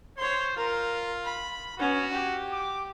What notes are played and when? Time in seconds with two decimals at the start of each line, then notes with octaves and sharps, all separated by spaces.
0.18 C5 C#5 C6
0.57 F4 A#4
1.24 B5
1.79 B3 C#4 F#4
2.13 G4
2.52 D6